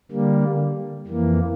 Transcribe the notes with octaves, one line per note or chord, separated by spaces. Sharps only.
D3 G3 A#3
F2 E3 A#3